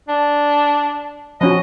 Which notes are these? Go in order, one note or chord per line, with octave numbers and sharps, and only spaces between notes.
D4
F3 C#4 F#4 D#5